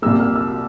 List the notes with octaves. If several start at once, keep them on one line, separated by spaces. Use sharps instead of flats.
C2 A#2 G3 A#3 E6
F6
E6